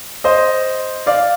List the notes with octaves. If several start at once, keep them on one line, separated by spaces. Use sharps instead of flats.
C5 D#5
D5 F5